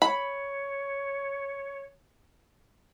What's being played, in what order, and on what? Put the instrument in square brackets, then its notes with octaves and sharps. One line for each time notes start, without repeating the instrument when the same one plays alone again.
[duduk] C#5 [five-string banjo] B5